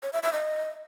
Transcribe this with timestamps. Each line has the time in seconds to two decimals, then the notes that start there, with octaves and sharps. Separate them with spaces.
0.03 C#5
0.13 E5
0.23 E5
0.33 D#5